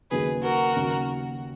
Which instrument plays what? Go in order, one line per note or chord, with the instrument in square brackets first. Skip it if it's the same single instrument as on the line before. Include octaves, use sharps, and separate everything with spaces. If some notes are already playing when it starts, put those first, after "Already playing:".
[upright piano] D#2 C#3 F#3 [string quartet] G#4 B4
[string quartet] F#4 A#4
[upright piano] D#2 C#3 F#3